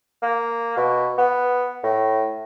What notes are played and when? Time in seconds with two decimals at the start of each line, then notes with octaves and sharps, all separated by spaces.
0.22 A#3
0.77 B2
1.18 B3
1.83 A2